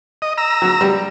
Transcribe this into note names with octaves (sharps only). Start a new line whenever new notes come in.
D#5
A#5 E6
F#3
G3